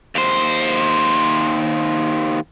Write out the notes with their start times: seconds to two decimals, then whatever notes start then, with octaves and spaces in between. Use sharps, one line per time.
0.15 D#2 C5